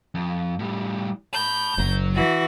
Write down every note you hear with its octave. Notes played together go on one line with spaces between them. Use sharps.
F2
A2 G3
A5 B5 G6
F#1 F#3 A#5
E3 F#4